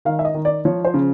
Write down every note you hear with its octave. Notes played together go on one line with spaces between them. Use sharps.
D#3 F5
E5
D#5
D#3
D5
F3 C#5
C5
C#3